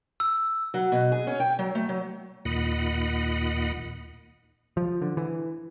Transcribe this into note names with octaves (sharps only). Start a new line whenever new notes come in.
E6
F#3
B2
G#4
C#4
G5
F#3
A3
F#3
D#2 A#2 D#5 F#5 B5
F3
D3
E3